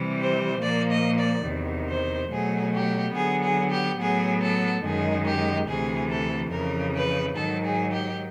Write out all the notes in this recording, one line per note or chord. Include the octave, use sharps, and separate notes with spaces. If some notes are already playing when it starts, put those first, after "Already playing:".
Already playing: C3 E3 G3
C5
A#2 F3 A#3 D5
D#5
D5
E2 C3 D#3
C5
B2 F#3 A3 G#4
G4
D3 F#3 B3 G#4
G#4
G4
A2 F#3 B3 G#4
A4
F#2 D#3 G#3 G#4
G4
D2 C3 E3 G#4
A4
F2 C#3 E3 A#4
B4
G#2 D#3 F#3 A4
G#4
G4